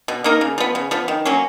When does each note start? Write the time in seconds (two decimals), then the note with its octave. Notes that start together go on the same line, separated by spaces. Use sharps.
0.08 B2
0.24 A#3 D#4 A#4
0.41 C#3
0.58 F3 B3
0.75 C#3
0.91 F3 B3
1.08 D#3
1.25 F#3 A#3 C#4